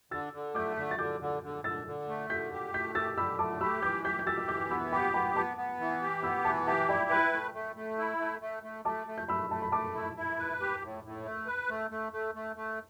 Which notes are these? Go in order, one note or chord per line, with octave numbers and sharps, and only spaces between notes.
D3 E6 A6
D3
A3 D6 G6
D3
A6
D3 D6 G6
D3
D3
D3 E6 A6
D3
A3
D3 G6 B6
G4
A3 G6 B6
G4 E6 A6
D3 B5 E6
A3 A5 D6
G4 B5 E6
E3 D6 G6
G4 G6 B6
G6
G4 E6 A6
E6
E3 D6 G6
B3 B5 E6
G4 G5 B5
B3 G5 B5
B3 A5 D6
B3
E3
G4
B3 B5 E6
E3 A5 D6
G4 E5 A5
E4 D5 G5
B4 G5 B5
A3
A3
A3
E4
A3
A3
A3
A3 A5 D6
A3
G6
A3 B5 E6
A3 A5
B5
A3 A5 D6
E4
E4
B4
G4
A2
A2
A3
B4
A3
A3
A3
A3
A3